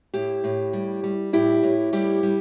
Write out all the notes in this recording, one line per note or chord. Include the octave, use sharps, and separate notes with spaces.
A2 E4 G4
A2
G3
G3
A2 E4 G4
A2
G3 E4 G4
G3